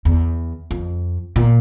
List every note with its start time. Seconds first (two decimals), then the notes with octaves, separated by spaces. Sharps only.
0.05 E2
0.71 F2
1.36 A#2